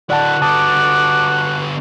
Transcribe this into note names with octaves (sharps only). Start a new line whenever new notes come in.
D3 E4 F#4 D5 F#5 A5
D3 B3 A5 D6 D#6